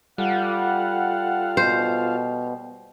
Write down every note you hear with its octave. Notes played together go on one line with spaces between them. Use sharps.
G3 F4 A4 F5 F#5
B2 C5